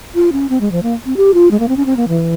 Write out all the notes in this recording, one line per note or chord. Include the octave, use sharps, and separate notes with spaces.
F4
C#4
C4
G#3
F3
A#3
C4
G4
F4
G#3
A#3
C4
C#4
C4
A#3
E3